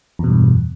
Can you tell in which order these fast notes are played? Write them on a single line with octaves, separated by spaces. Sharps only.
E2 B2 G2